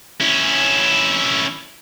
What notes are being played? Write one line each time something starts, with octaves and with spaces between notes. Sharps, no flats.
C#4 E4